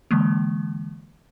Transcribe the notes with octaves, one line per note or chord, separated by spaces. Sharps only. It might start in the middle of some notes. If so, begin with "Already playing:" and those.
D3 E3 G#3 A#3